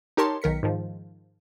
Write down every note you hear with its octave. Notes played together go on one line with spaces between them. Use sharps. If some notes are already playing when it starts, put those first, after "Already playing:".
D#4 G4 A#4 C#5 A5 C6
B1 D#3 A#4 B6 C#7
G#2 D#3 F3